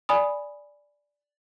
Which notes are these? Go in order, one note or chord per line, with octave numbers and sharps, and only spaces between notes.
D5 G#5 B5 D#6